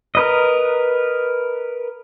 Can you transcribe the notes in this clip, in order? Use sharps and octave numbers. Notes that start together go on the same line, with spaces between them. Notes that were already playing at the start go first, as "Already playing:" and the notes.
A#4 B4 D#5